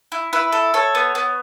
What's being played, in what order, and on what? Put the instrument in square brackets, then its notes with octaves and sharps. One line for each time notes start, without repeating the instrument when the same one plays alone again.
[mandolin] E4
E4 B4
A4
A4 C#5
B3
B3